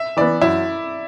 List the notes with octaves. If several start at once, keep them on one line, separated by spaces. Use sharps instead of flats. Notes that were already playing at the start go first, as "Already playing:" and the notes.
Already playing: E5
E3 B3 D5
F#2 E4